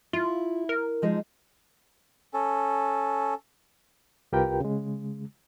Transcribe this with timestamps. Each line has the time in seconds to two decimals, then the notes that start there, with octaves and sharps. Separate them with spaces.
0.13 E4 F4
0.69 A#4
1.02 F3 G#3 D#4
2.34 C#4 A4
4.32 C2 F4 G4 A#4 B4 G5
4.60 C#3 G#3